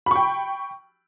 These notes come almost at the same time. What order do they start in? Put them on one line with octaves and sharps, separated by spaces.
B5 C#6 G5